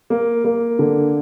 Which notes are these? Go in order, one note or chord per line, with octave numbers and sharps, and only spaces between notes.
A#3
A#3
D3